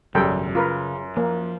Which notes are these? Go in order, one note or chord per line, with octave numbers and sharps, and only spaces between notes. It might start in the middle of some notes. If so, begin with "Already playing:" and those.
G#1 F#2 C#3 G3 A4 G5
C#3 F4 A#4 B4
F3 A#3